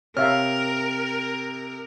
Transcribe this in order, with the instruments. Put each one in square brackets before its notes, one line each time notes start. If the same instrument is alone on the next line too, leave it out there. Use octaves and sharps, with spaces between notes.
[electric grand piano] C3 F6 [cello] A#4 [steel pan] C#5 E5 F5